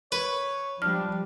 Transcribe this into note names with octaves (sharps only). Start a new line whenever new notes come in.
B4 C#5
F3 G3 D4 F6